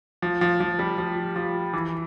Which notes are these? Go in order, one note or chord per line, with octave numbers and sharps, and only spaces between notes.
F3
F3
F3
G3
F3
F3
E3